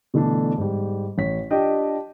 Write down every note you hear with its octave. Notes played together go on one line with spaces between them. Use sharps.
B2 D3 E3 A3 D4
G#2 G3
A1 C#5 B6
D4 F4 G4 D#5 G5